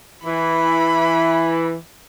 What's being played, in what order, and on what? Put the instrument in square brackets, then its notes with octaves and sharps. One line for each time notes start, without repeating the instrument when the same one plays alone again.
[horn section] E3 [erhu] B5